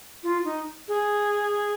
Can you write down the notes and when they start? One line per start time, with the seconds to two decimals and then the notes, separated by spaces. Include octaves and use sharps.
0.24 F4
0.45 D#4
0.88 G#4